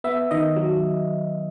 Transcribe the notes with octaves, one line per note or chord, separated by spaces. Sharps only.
B3 E5
D#3 D#5
F#3